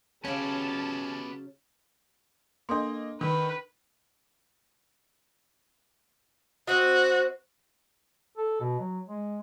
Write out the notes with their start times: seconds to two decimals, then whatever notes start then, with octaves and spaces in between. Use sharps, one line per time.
0.25 C#3 F#3 B3 C#4 G4 A5
2.69 A#3 D4 A4 D#5 C6
3.21 D#3 A#4 B4
6.67 C4 F#4 C5 D#5
8.38 A4
8.60 B2
8.80 F#3
9.09 G#3